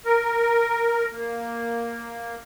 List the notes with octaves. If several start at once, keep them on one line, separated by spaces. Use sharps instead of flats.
A#4
A#3